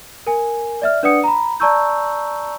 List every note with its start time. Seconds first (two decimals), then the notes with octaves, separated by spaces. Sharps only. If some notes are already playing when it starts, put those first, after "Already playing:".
0.27 A#4 G#5
0.82 D5 E5 F6
1.03 D4 B4 D5 F#5 D#6 C#7
1.24 A#5 B5
1.60 D5 A5 A#5 C#6 E6 G6